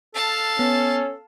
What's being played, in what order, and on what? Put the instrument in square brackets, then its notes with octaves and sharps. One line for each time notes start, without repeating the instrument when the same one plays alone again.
[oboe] A4 [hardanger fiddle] F5 A5
[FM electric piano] B3 [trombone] C#4